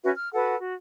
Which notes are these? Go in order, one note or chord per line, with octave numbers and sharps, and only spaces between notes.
C#4 F#4 B4 E5
F6
F#4 A4 B4 F#5
F#4